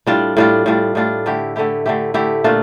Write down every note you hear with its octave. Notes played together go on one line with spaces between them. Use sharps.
A2 G3 D4 F4
A2 G3 D4 F4
A2 G3 D4 F4
A2 G3 D4 F4
D3 A3 E4 G4
D3 A3 E4 G4
D3 A3 E4 G4
D3 A3 E4 G4
A#2 A3 D4 F4